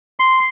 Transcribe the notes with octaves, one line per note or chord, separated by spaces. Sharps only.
C6